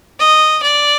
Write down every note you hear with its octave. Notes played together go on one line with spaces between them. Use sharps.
D#5
D5